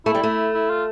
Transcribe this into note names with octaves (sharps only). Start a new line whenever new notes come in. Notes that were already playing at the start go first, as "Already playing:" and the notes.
A3 E4
G3
A3
E4
F4